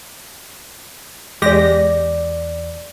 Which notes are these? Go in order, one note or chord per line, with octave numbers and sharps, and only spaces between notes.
E2 G#3 G4 D5 A#6